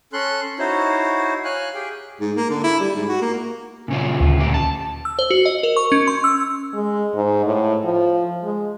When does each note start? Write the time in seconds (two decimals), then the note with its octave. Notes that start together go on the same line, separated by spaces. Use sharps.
0.13 C#4 A4 C6 F#6
0.59 D#4 E4 F#4 C5 C#5
1.45 C#5 F5 G#5 F#6
1.74 G4 G#4 G5
2.21 G#2
2.36 A#3
2.50 D3
2.64 E4
2.80 G3
2.95 G#2
3.08 F#4
3.22 A#3
3.88 A#2 C#3 F4
4.20 D2
4.38 A#2 A3 G4
4.54 A5
5.05 E6
5.19 C5
5.30 F#4
5.45 D#5
5.63 A#4
5.77 C#6
5.92 C#4
6.07 C6
6.24 E6
6.74 G#3
7.14 G#2
7.45 A2
7.84 F3
8.44 G#3